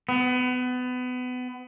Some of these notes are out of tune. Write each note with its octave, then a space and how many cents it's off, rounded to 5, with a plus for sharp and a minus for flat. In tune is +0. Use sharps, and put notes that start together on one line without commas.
B3 +25